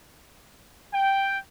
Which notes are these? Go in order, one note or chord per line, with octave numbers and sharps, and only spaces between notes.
G5